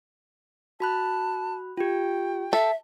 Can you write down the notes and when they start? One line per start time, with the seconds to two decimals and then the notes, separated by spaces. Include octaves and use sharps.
0.80 F#4 A5 B5 F#6
1.77 F4 G4 G5
2.53 A4 E5